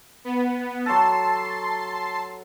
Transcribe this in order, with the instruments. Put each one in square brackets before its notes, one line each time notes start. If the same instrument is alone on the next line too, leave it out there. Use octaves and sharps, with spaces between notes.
[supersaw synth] B3
[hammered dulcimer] F#3 A4 [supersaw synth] A5 C6 C7